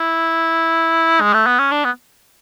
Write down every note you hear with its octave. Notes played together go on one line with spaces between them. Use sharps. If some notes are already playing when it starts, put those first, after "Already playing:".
Already playing: E4
G#3
A3
B3
C#4
D4
B3